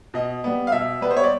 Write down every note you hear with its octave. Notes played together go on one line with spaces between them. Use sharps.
B2 D#5
G3 B3
F5
B2 E5
G3 B3 B4
C5
C#5
D5